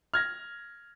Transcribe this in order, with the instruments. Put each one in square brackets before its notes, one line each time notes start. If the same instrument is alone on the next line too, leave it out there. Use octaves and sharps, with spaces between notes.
[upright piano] F6 G#6 A#6